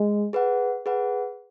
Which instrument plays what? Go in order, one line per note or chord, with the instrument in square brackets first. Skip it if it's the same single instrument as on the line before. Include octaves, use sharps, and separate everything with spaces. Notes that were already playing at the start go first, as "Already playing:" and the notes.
Already playing: [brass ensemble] G#3
[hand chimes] G#4 B4 F#5
G#4 B4 F#5